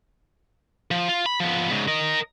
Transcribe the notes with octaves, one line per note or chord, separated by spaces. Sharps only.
F3
F4
B5
F3 B3
G#2 C#3
A#4 D#5